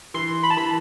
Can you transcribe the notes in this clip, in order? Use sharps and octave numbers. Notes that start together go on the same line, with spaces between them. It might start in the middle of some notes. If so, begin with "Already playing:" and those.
E3 C6
B5
A5
E3 B5